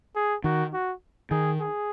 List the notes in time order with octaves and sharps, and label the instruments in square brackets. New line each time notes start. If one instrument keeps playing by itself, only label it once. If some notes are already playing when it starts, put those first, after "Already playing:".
[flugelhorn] G#4
[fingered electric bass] D#3 [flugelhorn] F#4
[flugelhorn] F#4
[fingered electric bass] D#3 [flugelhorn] G#4
[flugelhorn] G#4